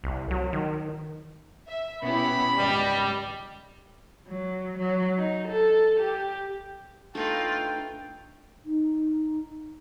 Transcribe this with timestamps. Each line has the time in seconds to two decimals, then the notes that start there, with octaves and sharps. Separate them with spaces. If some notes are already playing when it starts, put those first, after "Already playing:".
0.04 C2
0.31 F#3
0.53 D#3
1.68 E5
2.03 B2 B3 C#4 E4 G4 B5
2.57 G#1 C#2 G3 D#5
4.28 F#3
4.79 F#3
5.17 D#4
5.48 A4
5.98 G4
7.15 A3 D4 D#4 F4 B4 G5
8.65 D#4